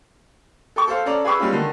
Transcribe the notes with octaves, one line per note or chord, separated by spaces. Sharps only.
A4 G5 C#6
A4 C5 F5
C#4 A4 D5 A#5
G#4 B4 G5 B5 C#6 E6
G3 G#3 B3 C#4 F4
D3 D#3 A3